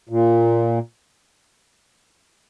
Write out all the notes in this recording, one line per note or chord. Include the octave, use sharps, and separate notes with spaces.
A#2